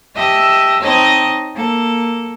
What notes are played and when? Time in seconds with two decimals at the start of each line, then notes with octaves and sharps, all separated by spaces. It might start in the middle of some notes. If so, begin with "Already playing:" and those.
0.15 G4 D#5 E5 A5 E6
0.81 C4 D#4 C#5 D#5 A5
1.54 A#3 A4